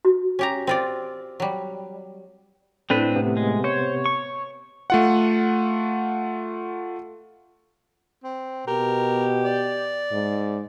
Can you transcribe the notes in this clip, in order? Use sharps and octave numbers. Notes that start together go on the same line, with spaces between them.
F#4
C#4 G4 A#5
C4 F4 D5
F#3 G3
A2 C4 D4 B4
C3 B3
G#3
C5 C#5
C#6
A3 F4 F#5
C4
B2 G4 A#4
D5
G#2